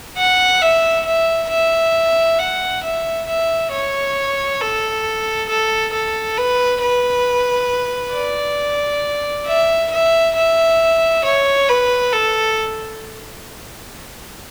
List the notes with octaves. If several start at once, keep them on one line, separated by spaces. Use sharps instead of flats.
F#5
E5
E5
E5
F#5
E5
E5
C#5
A4
A4
A4
B4
B4
D5
E5
E5
E5
C#5
B4
A4